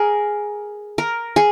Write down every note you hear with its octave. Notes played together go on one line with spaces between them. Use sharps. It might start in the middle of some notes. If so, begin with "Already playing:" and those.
Already playing: G#4 A#4
A#4
G#4